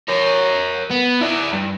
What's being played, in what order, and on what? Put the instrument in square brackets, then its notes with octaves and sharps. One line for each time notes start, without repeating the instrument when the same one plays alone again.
[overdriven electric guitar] A#4 C#5
B3
E4 D5
G2